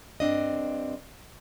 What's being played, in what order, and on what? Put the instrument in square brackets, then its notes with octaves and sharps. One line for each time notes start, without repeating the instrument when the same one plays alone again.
[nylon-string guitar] G2 C4 D4 D#5